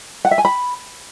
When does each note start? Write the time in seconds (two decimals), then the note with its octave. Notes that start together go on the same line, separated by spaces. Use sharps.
0.25 F#5
0.31 E5
0.38 G#5
0.45 B5